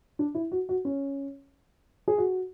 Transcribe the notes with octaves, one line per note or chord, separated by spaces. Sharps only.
D4
E4
F#4
F#4
C#4
G#4
F#4